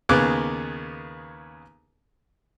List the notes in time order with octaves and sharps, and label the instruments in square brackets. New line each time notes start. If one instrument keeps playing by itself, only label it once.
[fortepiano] D#2 C#3 B3 G#4 D6 F#6